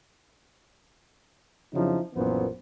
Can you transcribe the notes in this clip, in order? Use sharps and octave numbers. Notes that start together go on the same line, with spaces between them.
F2 C#3 F3 F#3 D#4 E4
A#1 F#2 A#2 E3 B3 C5